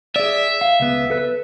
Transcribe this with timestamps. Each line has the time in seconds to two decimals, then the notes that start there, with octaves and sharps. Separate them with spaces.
0.16 G#4 D5 E5
0.61 F5
0.80 C#2 B3
1.10 A4 B4